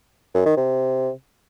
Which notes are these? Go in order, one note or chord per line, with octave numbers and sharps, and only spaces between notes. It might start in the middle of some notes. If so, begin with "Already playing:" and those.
F#2
D#3
C3